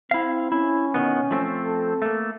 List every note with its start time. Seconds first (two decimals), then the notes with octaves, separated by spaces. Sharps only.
0.11 C4 E4 F5
0.52 C#4 E4
0.94 B2 D#3 B3
1.31 F3 A3 C4
1.65 A4
2.02 A3 A#3